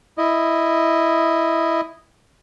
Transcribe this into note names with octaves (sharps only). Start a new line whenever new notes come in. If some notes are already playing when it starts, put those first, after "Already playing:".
E4 D#5